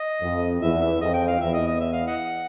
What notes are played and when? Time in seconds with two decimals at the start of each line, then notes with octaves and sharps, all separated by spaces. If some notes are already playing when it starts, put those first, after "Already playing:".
Already playing: D#5
0.22 F2
0.61 E2 E5
0.82 E5
1.01 F2 D#5
1.14 G5
1.28 F5
1.41 E2 E5
1.54 D#5
1.67 D#5
1.80 E5
1.93 F5
2.07 D#5 F#5